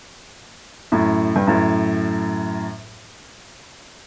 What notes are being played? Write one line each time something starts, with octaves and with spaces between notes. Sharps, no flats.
F#2 A2
G2
F#2 A2